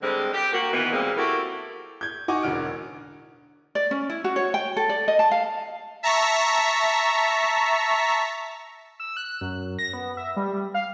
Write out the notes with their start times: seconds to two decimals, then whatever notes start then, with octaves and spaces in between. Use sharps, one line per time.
0.02 D3 G3 G#3 C4
0.34 G4
0.52 A#3 F#4
0.72 A#2 D#3 E3 B3
0.93 A#2 G3 G#3 A#3 C4
1.17 E4 F#4 G4 A4 A#4
2.01 G6 G#6
2.28 D#4 F#4 F#5 G#5 C#6 D6
2.42 E1 A1 D3 F6 D7
3.75 D5
3.91 C#4
4.10 E4
4.24 F#4
4.36 C#5
4.54 G5
4.77 A4
4.89 D5
5.08 D#5
5.19 A5
5.31 F5
6.03 E5 A5 A#5 C#6 B6
9.00 E6
9.17 F#6
9.41 F#2
9.79 A#6
9.93 B3
10.17 E5
10.36 G3
10.53 G3
10.74 F5